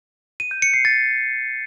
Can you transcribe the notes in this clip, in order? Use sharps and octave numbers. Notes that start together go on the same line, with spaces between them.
D#7
G6
C#7
C7
A6